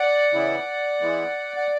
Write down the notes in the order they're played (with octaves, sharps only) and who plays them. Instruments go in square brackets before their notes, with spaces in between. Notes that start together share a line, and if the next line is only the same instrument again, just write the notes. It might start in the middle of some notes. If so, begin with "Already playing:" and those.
Already playing: [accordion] D5 F#5
C#3 E3 B3 E4
E3 G#3 B3 E4
F#5